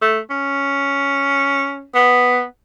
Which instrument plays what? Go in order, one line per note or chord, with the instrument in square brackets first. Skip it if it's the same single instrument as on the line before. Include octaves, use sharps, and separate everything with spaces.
[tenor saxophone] A3
C#4
B3